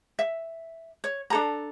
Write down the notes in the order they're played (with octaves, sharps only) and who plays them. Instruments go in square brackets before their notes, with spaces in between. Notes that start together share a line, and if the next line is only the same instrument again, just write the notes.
[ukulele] E5
C#5
D4 A4 A#5